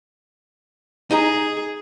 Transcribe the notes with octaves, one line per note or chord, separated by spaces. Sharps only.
D#4 G#4 D#5 A#5